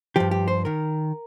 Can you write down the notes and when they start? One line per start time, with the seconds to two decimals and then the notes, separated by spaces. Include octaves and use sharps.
0.16 G2 F3 G4
0.31 G4
0.48 C5
0.65 D#3 A#4